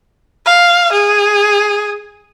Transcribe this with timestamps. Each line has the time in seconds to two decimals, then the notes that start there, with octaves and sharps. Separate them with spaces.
0.46 F5
0.92 G#4